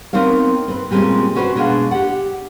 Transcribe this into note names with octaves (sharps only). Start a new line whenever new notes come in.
B3 C4 D#4 A#4 C#5 F5
C4 B4
A#2 G3 G#3 A#3 C4 C#4
C#4 F#4 B4 C5 D5
B2 G#3 D4 B4 F5 F#5
G4 F#5